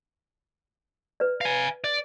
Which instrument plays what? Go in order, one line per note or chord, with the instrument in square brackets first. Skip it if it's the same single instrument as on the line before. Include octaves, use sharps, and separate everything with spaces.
[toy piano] B4 D5
[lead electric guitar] F5 G#5
D5